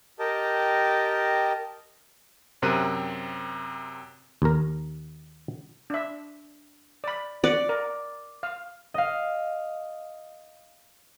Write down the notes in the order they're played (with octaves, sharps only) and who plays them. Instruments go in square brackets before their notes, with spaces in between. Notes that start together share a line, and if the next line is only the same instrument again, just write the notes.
[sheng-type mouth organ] G4 A#4 D#5 G5 A5
[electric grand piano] F#2 C3 C4 A#4 F#6 D#7
[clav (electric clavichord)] D#2 A#4
[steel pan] D4 E5
D5 B5
[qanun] D5 [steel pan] F#5 D6
[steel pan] A#4
F5
[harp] D#5 F5